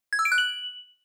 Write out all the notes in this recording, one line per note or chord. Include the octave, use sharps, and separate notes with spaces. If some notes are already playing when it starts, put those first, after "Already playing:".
G#6
E6
D7
F#6
F#7